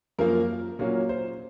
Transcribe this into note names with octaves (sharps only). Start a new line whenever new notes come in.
F#2 F3 A#3 A#4
A#2 F#3 A#3 C#4
C5